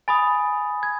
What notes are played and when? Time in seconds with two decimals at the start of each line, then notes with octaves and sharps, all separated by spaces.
0.08 G#5 B5 D#6 A6
0.83 G#6